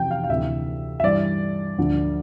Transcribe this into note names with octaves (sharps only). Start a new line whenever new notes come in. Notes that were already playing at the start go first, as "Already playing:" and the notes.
Already playing: F2 C3 E3 G5
F5
F5
D2 C3 E3 E5
E5
G2 E3 D5
D2 D3 F3